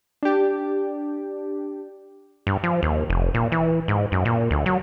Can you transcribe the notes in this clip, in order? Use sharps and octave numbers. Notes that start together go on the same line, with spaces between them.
D4 G4
G2
F3
D#2
F1
A#2
E3
G#2
F#2
A#2
D2
F#3